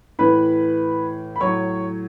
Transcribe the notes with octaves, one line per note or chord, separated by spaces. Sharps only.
A2 E3 B4 B5
B5
A2 F#3 C#5 C#6